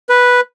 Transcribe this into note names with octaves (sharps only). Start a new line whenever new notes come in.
B4